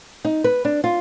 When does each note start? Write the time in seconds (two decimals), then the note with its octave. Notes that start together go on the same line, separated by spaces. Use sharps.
0.25 D#4
0.44 B4
0.65 D4
0.84 F4